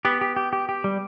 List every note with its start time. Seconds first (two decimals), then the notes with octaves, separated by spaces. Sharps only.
0.05 B3 G4
0.21 G4
0.36 G4
0.53 G4
0.69 G4
0.84 G3